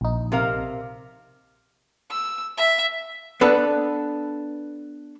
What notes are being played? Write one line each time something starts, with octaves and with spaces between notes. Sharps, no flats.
A#1 D#4
C3 A#4 F5
E6
E5
B3 D4 A4 B4